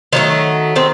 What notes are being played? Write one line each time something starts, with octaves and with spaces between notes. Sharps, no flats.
D#3 F#3 A3 D#4
D#3 C4